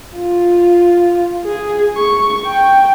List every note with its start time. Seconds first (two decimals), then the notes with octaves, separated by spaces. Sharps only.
0.18 F4
1.46 G#4
1.97 C#6
2.47 G5